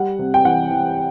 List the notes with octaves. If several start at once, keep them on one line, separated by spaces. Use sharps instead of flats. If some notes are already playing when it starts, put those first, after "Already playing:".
Already playing: G3 F#5
C3
G5
E3 F#5
E3